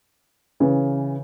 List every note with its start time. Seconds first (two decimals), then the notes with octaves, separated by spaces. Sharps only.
0.60 C#3 E3